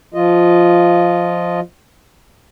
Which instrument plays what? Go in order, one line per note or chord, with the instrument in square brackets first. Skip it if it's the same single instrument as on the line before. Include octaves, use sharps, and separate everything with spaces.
[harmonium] F3 F4 D#5